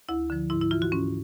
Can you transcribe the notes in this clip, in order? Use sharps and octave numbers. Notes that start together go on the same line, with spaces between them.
D2 E4
D3 F3
G#2 E4
E4
E3 F4
F#4
G#2 C#4